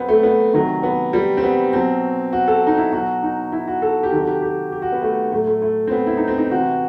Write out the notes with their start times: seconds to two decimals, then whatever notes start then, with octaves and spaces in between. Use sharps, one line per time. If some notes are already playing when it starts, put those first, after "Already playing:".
Already playing: B2 F#3 B3 C4
0.08 A3
0.23 B3
0.53 C3 D#3 F#3
0.83 B3
1.13 G3
1.37 C4
1.43 B3
1.73 B2 F#3 C4
2.33 F#4
2.48 A4
2.67 D#4
2.77 E4
2.92 B2 F#3 F#4
3.23 D#4
3.52 E4
3.68 F#4
3.82 A4
4.03 G4
4.12 C3 D#3 F#3 A4
4.20 F#4
4.27 G4
4.42 G4
4.72 G4
4.82 F#4
4.92 B3
5.02 A3
5.32 A2 F#3 A3
5.47 A3
5.62 A3
5.87 C4
5.92 B3
6.07 E4
6.17 D#4
6.28 C4
6.38 D#4
6.51 C3 E3 F#4